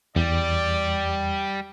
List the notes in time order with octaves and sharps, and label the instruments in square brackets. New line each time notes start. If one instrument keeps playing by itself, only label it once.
[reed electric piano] E2 [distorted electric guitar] G3 [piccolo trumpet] D5